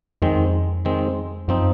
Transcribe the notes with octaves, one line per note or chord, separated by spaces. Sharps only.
F2 D#3 G#3 C4
D#3 G#3 C4
F#2 F3 C4 D#4